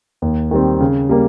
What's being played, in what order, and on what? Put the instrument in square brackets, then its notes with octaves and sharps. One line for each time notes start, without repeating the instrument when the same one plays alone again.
[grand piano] D#2
D#3 G3 C4
C#3
G3 A#3